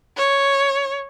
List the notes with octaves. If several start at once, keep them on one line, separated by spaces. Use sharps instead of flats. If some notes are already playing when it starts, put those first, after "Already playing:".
C#5